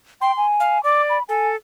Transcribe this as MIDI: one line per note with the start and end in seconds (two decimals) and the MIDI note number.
0.21 0.32 79
0.21 0.46 84
0.37 0.84 80
0.60 0.78 77
0.84 1.18 74
0.84 1.02 86
1.10 1.23 83
1.29 1.56 69
1.29 1.49 80